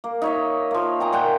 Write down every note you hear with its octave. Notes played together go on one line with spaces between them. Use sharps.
A#3
D#4 C#5 E5
F3 A#3
G5 G#5 A#5
A#2 F#5 G5